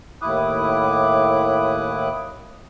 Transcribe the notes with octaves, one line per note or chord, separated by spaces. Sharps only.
D#2 A2 E4 D6 D#6 F#6